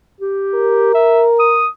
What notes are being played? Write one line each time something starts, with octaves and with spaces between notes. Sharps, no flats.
G4
A#4
E5
D#6